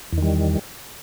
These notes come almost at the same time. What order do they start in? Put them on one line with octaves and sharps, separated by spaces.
E2 D#3 G3